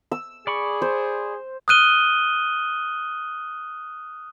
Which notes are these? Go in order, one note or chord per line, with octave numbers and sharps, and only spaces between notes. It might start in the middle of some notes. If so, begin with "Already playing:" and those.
E6
G#4 D5 B5 C#6
C5
D#6 F6 F#6 D#7 G7